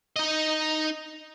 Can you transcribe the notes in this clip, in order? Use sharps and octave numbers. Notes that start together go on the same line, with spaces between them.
D#4 D#5